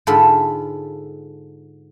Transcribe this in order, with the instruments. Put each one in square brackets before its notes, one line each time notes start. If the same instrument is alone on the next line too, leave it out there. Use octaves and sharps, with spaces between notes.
[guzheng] G#2 D3 G#3 F4 A4 B5